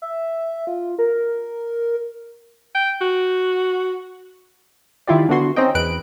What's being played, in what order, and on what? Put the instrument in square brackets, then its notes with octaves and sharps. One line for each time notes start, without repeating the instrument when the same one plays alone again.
[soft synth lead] E5
F4
A#4
[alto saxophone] G5
F#4
[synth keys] D#3 E4 F4 G4 D5
D3 B3 F#4 C6
C4 C#4 D#4 D#5 G5
E2 B4 F#6 D7